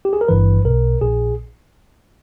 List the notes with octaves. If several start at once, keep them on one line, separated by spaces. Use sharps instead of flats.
G4
G#4
A#4
G#1 G2 E3 B4
B1 B2 A#4
A#1 A#2 G#4